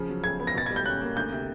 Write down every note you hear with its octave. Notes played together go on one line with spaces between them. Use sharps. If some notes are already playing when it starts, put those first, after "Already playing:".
Already playing: C#3 F3
F#3
C#3 G#6
B3
A#6
B2 A6
G3 G#6
G6
C#4 F#6
A#3
D2 G6
C3